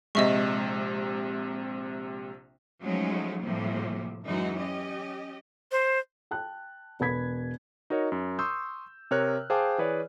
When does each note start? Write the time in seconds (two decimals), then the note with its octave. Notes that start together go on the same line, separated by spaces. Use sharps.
0.15 A#1 C3 G#3 D#5 E5 C#6
2.83 F3 F#3 G#3 A3 C#4 D#4
3.40 A2 C3 F3 G3 A#3
4.24 F#2 E3 G#3 D#4 F#4
4.58 C#4 G4 D#5
5.72 C5
6.31 G5 A5 F#6
7.00 E1 B4 B5 G#6 B6
7.90 D#4 F#4 A#4 C#5 D#5
8.12 F#2
8.39 C6 C#6 D#6 E6 G6
9.11 C3 A#4 C#5 F6 F#6
9.50 G#4 C5 F5 G5 A5 D6
9.78 E3 G#4 B4 C#5 D5